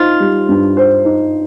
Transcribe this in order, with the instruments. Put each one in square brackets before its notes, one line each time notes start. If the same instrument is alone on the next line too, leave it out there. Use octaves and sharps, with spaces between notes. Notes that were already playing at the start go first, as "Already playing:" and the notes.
Already playing: [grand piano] D#4 C5 [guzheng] F4
[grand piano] G3
G2
C5
D#4